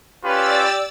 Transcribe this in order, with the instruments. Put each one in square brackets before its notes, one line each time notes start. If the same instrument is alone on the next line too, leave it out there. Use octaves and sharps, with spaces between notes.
[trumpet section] C#4 F4 B4 [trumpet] G4 [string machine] D5 E6 A6